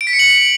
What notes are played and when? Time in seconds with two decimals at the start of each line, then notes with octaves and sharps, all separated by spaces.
0.01 D7
0.07 B6
0.13 C#7
0.19 F#7